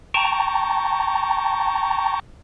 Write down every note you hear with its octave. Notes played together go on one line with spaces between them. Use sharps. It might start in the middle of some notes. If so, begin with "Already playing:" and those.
G5 A5 A#5 C#6